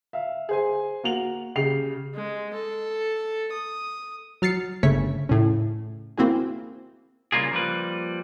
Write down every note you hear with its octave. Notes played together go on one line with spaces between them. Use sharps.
E5 F5
G#4 C5 G#5
A#3 F#4 F7 F#7
C#3 G4 C7 F7
G#3
A4
D#6
F#3 F6 A6 C7 C#7
G1 C#3 A3 C#5 C#6 B6
A2 C#3
A#3 C4 E4 F#4 G#4
C#3 G3 A#3 F4 G#4
F3 G3 A#3 B4